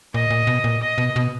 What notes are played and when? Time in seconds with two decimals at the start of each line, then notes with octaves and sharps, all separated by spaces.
0.14 A#2 D#5
0.30 A#2
0.47 B2
0.64 A#2
0.82 D#5
0.98 B2
1.16 B2